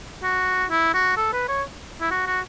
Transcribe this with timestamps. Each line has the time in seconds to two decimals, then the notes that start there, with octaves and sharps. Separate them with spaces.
0.23 F#4
0.70 E4
0.94 F#4
1.17 A4
1.33 B4
1.48 C#5
2.01 E4
2.11 F#4
2.26 F#4